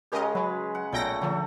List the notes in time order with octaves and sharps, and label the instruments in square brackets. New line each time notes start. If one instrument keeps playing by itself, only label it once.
[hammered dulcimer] C#3 G#3 C#5 [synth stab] G4 A#4 D#5
[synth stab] F#3 [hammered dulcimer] B4
[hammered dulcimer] F#5
[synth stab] B1 G5 A#6 [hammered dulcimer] A#2 F#3 A3
[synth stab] D3 F3 [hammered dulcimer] F#3 A3